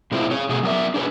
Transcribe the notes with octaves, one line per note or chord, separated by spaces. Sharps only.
A#2 G#3 C4 E4 F4
G#4 C#5
B2 A3 G#4
F#3 B3 A#4 D5 E5
D4 G#4 B4 C#5